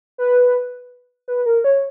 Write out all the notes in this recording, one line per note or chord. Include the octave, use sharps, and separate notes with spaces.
B4
B4
A#4
C#5